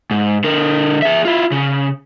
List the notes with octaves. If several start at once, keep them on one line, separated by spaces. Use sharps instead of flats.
G#2
D3 A#4
G#4 E5
E4 F4
C#3